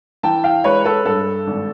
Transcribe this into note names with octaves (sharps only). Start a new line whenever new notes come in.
E3 G5 A5
F5 G5
G#3 B4 C#5
A4 B4
G2 A4
G#1